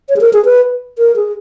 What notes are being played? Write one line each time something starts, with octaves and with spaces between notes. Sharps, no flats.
C#5
G#4
A#4
G#4
B4
A#4
G#4